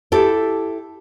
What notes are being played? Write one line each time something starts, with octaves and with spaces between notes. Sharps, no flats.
E4 G4 A4